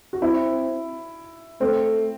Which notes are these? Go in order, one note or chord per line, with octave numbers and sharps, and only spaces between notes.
F#4
C4 E4
A3 C4